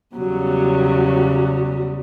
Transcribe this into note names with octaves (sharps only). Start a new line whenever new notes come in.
E2 C#3 F#3 G3